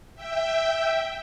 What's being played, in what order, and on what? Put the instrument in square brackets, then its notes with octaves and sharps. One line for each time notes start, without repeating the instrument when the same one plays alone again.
[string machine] E5 G5